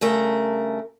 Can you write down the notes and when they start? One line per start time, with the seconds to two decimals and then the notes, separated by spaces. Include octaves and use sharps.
0.01 G2 C#3 A3 A#4